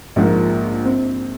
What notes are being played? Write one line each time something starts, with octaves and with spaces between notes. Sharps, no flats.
A#1 G#2 F3 A#3
C4